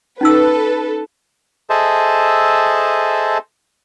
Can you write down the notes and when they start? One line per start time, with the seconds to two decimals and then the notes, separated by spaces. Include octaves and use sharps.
0.21 C#4 D#4 A4 B4 E6
1.70 G#4 A4 C5 D#5 E5 A5